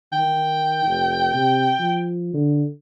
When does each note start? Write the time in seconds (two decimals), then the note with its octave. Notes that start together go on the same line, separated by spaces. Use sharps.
0.13 D#3 G5
0.86 F1
1.34 C3
1.80 F3
2.34 D3